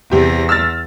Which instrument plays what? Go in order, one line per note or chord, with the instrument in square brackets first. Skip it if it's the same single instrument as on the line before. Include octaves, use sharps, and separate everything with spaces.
[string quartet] E2 A#6 [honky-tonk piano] C3 G4
[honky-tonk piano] E6 F6 A6